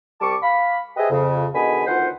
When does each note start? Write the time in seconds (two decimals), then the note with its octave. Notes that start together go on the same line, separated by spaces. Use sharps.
0.21 C2 G3 A5 C#6 D6
0.42 F5 B5
0.96 G4 G#4 B4 C5 D#5 E5
1.10 F2 C#3
1.54 B2 D3 D#3 G#4 G#5 B5
1.86 D2 D#3 B3 F4 C5 F#5